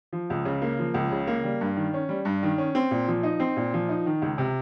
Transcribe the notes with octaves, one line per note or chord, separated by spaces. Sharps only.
F3
C#2
C#3
A#3
F3
C#2
C#3
A#3
G3
G2
D#3
C#4
G3
G2
D#3
C#4
C4
A#2
F3
D#4
C4
A#2
F3
D#4
D#3
C#2
C3